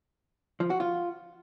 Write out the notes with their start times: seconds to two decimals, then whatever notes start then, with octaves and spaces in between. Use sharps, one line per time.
0.60 F3
0.70 F#4
0.80 F4